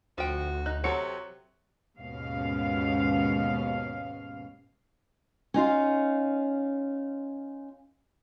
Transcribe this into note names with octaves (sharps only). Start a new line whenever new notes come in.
D2 F3 F#4 G5
D#4 F#6
C3 F#3 C4 F#4 A4 C#5 C#7
D#2 G#2 B2 C#4 F5
C#4 D#4 F4 F5